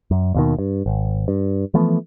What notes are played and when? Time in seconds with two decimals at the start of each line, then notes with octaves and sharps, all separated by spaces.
0.11 F#2
0.35 D#2 B2 D#3
0.59 G2
0.86 G#1
1.28 G2
1.74 E3 F3 A3 B3